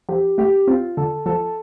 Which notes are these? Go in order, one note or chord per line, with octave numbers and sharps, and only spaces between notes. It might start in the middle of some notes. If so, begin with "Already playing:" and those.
F3 G4
A3 G4
C4 F4
D3 A4
F3 A4